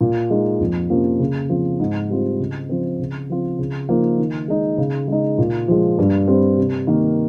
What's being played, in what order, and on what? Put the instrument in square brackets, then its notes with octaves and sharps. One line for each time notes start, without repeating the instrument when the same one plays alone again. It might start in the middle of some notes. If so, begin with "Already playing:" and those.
[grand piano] A#2
G#3 D#4
F2
C3 F3 A#3 C#4
C#3
F3 C4
G#2
G3 C4 F4
C#3
F3 C4
C#3
F3 C4 F4
C#3
F3 A#3 D#4
D#3
G#3 D#4
C#3
G#3 D#4
A#2
F3 G#3
G2
G3 C4
C3
D#3 A#3